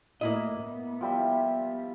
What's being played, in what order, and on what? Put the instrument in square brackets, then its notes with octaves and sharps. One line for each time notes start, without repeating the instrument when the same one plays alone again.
[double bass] A2 [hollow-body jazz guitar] A#3 E4 D#5
[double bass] B3
[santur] F3 G3 E5